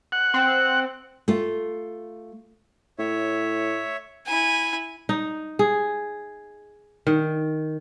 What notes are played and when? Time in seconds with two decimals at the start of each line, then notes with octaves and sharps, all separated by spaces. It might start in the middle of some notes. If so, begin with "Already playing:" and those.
0.12 F#5
0.34 C4
1.28 A3 F4
2.99 A2 C#5 E5
4.27 E4 G#5
5.09 D#4
5.59 G#4
7.07 D#3